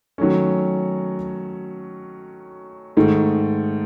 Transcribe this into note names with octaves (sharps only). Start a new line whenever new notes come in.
D#3 F#3 A3 C#4
G#2 D#3 A3